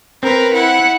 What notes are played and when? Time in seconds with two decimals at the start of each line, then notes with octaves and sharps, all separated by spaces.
0.23 C4 A#4 B4
0.54 E4 F#5